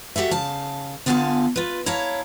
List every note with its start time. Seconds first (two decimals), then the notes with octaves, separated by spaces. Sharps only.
0.16 F#4 G4 A4 E5
0.31 C#3 F5 A5
1.06 D3 B3 F4 F5 G#5 A5
1.56 F4 B4
1.86 E4 C#5 F5 A5 A#5